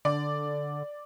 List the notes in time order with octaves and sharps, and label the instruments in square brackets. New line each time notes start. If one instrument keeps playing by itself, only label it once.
[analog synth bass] D3 [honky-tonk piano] D5